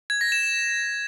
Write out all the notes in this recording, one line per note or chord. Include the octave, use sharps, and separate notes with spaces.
G#6
A#6
E7
E7